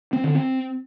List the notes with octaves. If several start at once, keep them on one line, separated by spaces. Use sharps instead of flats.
C4
D3
C4